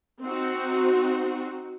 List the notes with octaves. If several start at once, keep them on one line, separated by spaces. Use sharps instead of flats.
C4 D#4 F#4